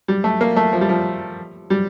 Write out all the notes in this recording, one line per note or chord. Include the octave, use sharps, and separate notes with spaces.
G3
A3
A#3
A3
F3
G3
F3
G3